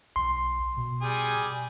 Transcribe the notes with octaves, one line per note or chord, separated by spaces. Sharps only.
B1 C6
B2
G3 G#4 G#5